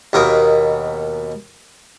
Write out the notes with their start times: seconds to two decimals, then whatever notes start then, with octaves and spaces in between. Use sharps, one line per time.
0.13 D#2 B2 A#4 D#6